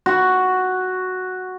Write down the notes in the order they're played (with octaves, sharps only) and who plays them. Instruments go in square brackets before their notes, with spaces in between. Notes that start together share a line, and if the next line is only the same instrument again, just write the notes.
[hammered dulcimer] F#4